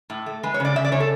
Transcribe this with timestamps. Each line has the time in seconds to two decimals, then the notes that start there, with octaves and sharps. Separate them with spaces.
0.10 A2
0.26 A3
0.43 G#3 B4
0.54 C#5
0.60 C#3 D5
0.76 C#3 E5
0.85 D5
0.92 C#3 C#5
1.00 A4